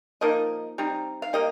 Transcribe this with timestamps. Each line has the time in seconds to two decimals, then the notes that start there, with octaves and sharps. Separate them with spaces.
0.21 F3 A#3 D#4 D#5
0.78 G3 C4 D#4
1.22 F5
1.33 G3 A#3 D#5